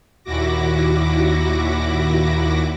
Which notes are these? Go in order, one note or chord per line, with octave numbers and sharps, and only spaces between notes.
D#2 A#2 E4 F#4 D6 A#6